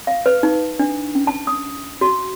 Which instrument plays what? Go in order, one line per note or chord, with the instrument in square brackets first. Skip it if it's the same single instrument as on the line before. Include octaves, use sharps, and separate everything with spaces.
[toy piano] F5
B4
D#4
D4
C#4
A5
D#6
F#4